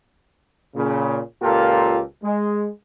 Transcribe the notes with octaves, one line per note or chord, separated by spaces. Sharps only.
A#2 C#3
C#2 A#2 F4 G4 A4 A#4
G#3